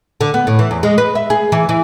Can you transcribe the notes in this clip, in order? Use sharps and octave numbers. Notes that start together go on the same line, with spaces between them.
D3
B3
A2
E3
E2
G#3
B4
E5
G#4
E3
E3